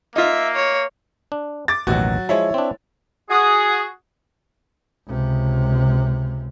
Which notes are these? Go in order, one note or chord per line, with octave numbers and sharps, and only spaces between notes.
A#3 D#4 F4 E5
C#5
D4
D6 A6
A1 D#2 B2 F#3 F#4
F3 G#3 E4 C#5
C4 D4
F#4 G#4 D#6
C#2 C3